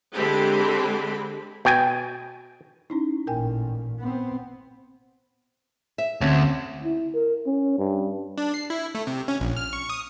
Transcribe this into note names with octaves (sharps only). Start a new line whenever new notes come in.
D3 G#3 C4 G4 B5
B2 G5 G#5
C#4 D#4 E4
A1 A#2 A#4 G5 G#5
B3 C4
E5
D2 C4 C#4
E4
A#4
C#4
G2
D4
C7
E4
A3
C3
C#4
A#1
F6
C#6
D#6